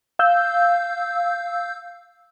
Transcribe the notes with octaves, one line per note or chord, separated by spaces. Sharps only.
F5 E6 G6